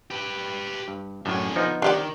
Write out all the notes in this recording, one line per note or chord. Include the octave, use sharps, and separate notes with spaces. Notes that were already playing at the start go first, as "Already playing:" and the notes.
G4 B4
G2
F#2 A2 D3 G#4
F3 B3 D#4
D#3 D4 G4 D5